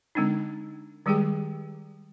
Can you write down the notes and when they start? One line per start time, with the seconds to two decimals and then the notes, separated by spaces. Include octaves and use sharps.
0.15 D3 G#3 C4 D4 D#4
1.06 D#3 G3 G#3 G4 G#4 G5